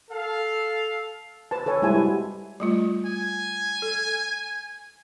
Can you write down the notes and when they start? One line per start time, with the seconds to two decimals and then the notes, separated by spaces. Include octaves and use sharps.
0.10 A4 F5
1.51 B4 C5 A5
1.66 A4 B4 C#5 G#5
1.82 G3 G#3 E4 C5 G#5
1.95 F#4 G4 E5
2.60 G3 A3 F4
3.06 G#5
3.82 A4